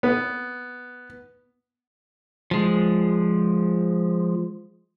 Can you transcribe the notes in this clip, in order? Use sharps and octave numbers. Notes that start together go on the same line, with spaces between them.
B3
F3 G#3